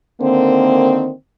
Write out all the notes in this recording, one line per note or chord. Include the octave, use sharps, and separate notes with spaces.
D3 D#3 A#3 C4